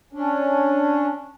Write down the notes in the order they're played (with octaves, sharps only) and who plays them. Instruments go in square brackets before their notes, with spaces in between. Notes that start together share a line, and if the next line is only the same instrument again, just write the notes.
[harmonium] C#4 D4